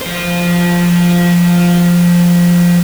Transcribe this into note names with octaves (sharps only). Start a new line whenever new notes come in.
F3 C5